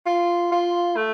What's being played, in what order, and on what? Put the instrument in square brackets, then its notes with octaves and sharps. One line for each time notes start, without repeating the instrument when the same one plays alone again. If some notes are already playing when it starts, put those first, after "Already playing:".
[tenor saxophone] F4
F4
A3